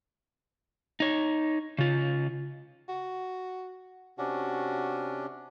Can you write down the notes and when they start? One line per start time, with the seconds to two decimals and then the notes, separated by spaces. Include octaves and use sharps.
1.00 D#4 C#5
1.78 C#3 F4
2.89 F#4
4.18 C3 C#4 D4 F#4